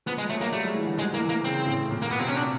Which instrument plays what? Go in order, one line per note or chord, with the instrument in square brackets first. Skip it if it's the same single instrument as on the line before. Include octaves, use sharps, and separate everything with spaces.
[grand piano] F3 [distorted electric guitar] B3
[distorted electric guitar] G#3
[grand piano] F#3 [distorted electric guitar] A3
[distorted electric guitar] A#3
[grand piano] G3 [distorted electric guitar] A3
[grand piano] G#3
E3
D3
[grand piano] F3 [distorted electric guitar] G#3
[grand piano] E3 [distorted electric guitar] A#3
[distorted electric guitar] A#3
[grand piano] C#3 [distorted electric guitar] C4
[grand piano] A2
A#2
[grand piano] B2 [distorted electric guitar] A#3
[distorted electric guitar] B3
[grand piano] C3 [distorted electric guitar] C4
[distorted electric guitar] C#4
D4